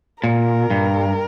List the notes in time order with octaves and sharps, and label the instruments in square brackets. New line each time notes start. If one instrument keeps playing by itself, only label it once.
[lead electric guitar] A#2 [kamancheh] A#4
[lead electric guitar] G2